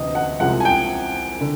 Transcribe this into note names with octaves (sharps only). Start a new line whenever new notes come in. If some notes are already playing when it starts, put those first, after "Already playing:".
Already playing: D2 C3 E3 D#5
F#5
C2 C3 F3 G#3 F#5
G#5
G5
D3